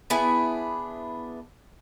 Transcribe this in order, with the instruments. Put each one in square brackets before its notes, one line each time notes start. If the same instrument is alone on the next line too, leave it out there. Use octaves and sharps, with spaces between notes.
[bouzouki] B3 D4 E4 G#4